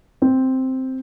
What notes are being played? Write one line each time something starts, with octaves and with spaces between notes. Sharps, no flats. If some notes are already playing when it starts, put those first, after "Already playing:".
C4